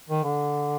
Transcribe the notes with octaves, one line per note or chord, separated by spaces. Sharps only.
D#3
D3